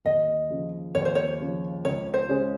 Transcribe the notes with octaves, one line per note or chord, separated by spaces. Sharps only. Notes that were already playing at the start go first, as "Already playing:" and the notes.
D#2 D#5
C#3 F3
D#2 C#5
C5
C#5
C#3 F3
C#2 C#5
C5
C#3 G#3 C#4 G#4